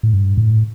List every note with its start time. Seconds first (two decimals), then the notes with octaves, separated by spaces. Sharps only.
0.03 A2
0.13 G2
0.38 A2